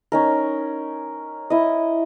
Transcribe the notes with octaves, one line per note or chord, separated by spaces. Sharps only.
C#4 D#4 A#4
E4 D#5